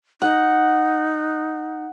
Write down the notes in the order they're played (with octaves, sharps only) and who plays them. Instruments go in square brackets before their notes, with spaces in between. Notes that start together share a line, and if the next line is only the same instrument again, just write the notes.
[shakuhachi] D#4 [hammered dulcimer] F#5